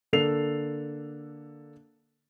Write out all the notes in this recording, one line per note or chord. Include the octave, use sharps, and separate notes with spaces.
D3 A#3 A4 C7 F7